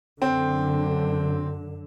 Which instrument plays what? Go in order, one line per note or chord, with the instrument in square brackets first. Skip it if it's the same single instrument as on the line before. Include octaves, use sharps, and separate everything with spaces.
[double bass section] F#2 D3 [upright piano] C4